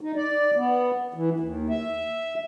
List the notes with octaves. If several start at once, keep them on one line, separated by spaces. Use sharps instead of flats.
D#4
D5
B3
E3
D#2
E5